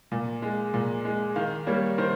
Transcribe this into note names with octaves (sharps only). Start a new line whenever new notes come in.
A#2
G#3
A#2
G#3
D#3 F5
G3 A#3 C#5
D#3 C5